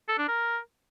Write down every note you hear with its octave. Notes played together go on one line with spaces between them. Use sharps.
A4
D4
A#4